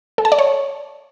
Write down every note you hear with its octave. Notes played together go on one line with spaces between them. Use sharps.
A4
A5
D5
C#5